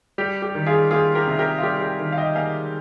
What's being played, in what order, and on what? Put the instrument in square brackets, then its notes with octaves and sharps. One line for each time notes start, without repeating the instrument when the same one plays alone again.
[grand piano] G3 G4
G4
D#3
F4 G#4
A#3 F4 G#4
G4 A#4
C3
G4 A#4
F4
G3 G4
G4
D#3
F5
D#5 G5
A#3 F5 G#5